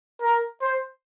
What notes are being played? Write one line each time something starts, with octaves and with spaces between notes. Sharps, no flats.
A#4
C5